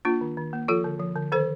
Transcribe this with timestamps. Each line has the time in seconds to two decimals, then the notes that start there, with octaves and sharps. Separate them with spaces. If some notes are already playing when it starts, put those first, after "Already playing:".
0.05 A#3 D4 F4
0.21 D#3
0.37 D#3
0.53 A#3
0.68 F3 F4 A4
0.84 D3
1.00 F3
1.16 D3
1.32 D#3 A4 C5